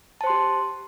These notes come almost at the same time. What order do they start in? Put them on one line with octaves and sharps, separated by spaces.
A5 C5 C6 G4